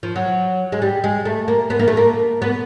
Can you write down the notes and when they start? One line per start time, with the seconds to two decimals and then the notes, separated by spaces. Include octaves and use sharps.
0.03 F3
0.16 F#3
0.72 G#3
0.82 G3
1.04 G#3
1.25 A3
1.48 A#3
1.70 B3
1.79 A#3
1.88 A3
1.97 A#3
2.42 B3